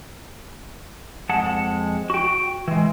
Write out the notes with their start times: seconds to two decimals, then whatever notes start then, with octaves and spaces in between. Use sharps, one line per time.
1.29 F2 G#3 F#5 A5
2.10 F#4 G5
2.68 E3 G#3